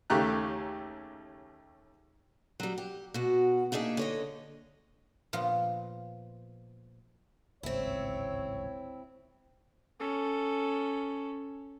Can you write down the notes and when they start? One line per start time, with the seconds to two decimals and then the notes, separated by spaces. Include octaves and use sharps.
0.10 D#2 C#3 A3 G4 A#5 F#6
2.60 F#3 G3
2.78 G4
3.14 B2 F#4
3.72 A#3 D4 D#4 G#4 E5
3.97 D3 C#5 D#5
5.33 A#2 F3 B3 F4 B4
7.63 D1 G#1 C#2 C4 E4 C#5
10.00 C#4 A4